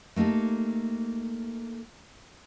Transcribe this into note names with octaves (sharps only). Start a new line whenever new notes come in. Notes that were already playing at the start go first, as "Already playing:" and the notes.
A3 A#3 D#4 G4 A4